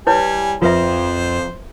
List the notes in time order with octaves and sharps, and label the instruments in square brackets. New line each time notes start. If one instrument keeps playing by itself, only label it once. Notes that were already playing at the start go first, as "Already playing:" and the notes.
[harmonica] G3 G#5 [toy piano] E4 B4 C#5
[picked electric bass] F2 F3 [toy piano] F4 B4 E5 [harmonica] C5